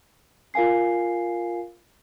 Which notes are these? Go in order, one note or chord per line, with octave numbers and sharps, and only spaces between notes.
F4 A#4 F5 G#5 C7